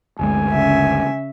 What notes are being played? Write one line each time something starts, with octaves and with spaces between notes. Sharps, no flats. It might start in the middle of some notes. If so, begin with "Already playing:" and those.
G1 D2 G#3 G#5
C#3 E5